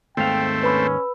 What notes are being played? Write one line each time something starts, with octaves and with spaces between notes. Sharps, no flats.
D#2 G#2 A3 C4 F5 G5
C#4 B4 B5 E6